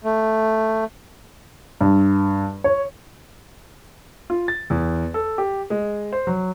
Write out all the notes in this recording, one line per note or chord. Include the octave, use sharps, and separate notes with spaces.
A3
G2
C#5
F4
A6
E2
A4
G4
G#3
C5
F#3